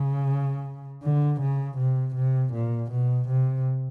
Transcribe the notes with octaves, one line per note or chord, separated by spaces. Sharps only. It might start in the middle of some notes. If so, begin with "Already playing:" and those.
Already playing: C#3
D3
C#3
C3
C3
A#2
B2
C3